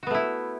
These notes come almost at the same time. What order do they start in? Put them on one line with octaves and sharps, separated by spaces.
F#4 B3 A3 E4